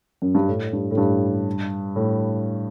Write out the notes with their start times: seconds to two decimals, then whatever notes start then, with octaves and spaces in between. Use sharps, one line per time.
0.22 F#2
0.35 G2
0.48 A2
0.73 G2
0.91 A2
0.98 G2
1.96 A2